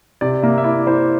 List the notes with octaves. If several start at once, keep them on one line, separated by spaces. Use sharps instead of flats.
C3 D5
A#3 E5
E5
E4 D5
E4 C5